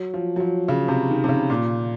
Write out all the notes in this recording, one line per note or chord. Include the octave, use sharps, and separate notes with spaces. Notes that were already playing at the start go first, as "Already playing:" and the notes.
Already playing: F#3
F3
F#3
F3
C#3
C3
D#3
C3
C#3
A#2